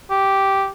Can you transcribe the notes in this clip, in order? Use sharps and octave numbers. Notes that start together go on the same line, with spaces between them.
G4